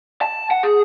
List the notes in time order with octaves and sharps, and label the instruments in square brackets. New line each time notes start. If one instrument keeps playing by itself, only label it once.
[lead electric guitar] A5
F#5
G#4